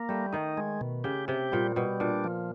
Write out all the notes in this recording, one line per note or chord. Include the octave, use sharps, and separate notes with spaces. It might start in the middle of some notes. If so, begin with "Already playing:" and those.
Already playing: A#3
G3 A3
D#3 D#4
G#3
B2
C#3 G4
C3 G4
A#2 G3
B2 G3
A#2 D4
F3